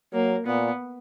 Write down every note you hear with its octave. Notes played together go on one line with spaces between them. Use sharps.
F#3 A#3
A#2 B3